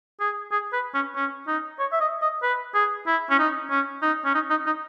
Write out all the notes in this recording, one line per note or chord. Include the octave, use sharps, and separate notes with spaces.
G#4
G#4
B4
C#4
C#4
D#4
C#5
E5
D#5
D#5
B4
G#4
E4
C#4
D#4
C#4
D#4
C#4
D#4
D#4
D#4